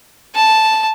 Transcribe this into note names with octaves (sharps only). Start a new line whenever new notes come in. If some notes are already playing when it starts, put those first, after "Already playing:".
A5